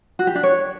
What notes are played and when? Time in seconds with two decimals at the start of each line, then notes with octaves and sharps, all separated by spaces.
0.19 F#4
0.27 G4
0.35 D4
0.43 C#5